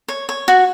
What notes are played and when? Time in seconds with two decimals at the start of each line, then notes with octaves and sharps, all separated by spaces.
0.08 C#5
0.29 C#5
0.48 F#4